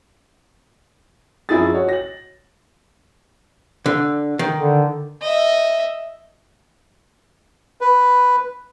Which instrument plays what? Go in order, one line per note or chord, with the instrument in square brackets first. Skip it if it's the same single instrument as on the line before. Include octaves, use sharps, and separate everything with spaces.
[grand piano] F#2 F3 E4 G#4 A6
F#4 C#5
A#6 F#7
[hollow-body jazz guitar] D3
D#3
[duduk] D3
[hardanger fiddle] D#5 E5
[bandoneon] B4